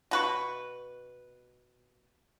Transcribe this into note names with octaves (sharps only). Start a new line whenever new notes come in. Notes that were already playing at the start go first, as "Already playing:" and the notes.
B2 B4 C#6